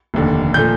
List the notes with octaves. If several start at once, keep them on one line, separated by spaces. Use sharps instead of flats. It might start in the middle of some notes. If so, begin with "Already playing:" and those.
F1 D#2 D3
A#2 F3 A3 G6